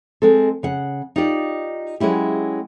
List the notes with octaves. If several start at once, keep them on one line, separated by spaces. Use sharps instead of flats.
G#3 C4 A4
C#3 F#5
D#4 F4 G4 D5
F#3 G#3 C#4 E4 G4